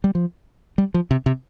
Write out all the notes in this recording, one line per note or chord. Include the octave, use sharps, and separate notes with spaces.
G3
F3
G3
F3
C3
C3